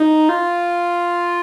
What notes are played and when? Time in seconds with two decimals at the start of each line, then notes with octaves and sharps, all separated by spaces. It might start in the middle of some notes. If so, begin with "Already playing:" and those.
Already playing: D#4
0.29 F4